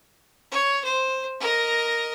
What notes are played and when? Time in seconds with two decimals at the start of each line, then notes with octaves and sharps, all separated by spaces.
0.52 C#5
0.84 C5
1.40 A#4 D#5